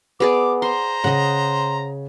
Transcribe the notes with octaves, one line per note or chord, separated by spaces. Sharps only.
B3 G#4 D5 D6
C5 A#5 C6
C#3 D#5 F#5